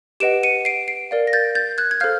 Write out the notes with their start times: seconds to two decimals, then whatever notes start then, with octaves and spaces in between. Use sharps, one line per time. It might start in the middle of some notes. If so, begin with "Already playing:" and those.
0.20 G4 B4 D#5 F#5 D7 E7
0.43 C#7 D#7
0.65 C7 D7
0.88 C7 D7
1.11 A#4 D5 F5
1.27 A#6
1.33 G6 A6
1.55 G6 A6
1.78 F#6 G#6
1.91 G#6
2.00 A4 C5 F5 F6 G6